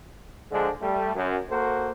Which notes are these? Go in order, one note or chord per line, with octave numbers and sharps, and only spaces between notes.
D3 F3 G#3 D4
G3 A3
F#2
A#3 F#4 A4 C5